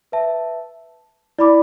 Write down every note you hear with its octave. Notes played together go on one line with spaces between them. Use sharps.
B4 E5 A5
E4 D5 B5 D6